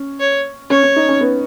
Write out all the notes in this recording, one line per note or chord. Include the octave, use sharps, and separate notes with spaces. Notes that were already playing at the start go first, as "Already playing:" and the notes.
Already playing: C#4
C#5
C#4 C#5
C#4
D#4
C#4
B3